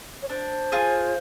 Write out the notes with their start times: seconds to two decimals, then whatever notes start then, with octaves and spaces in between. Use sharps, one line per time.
0.22 C#5
0.29 D4 C5
0.72 F4 G#4